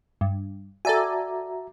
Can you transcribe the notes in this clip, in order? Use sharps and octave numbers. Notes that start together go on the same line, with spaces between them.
G2
F#4 A4 D5 E5 G#5 A#5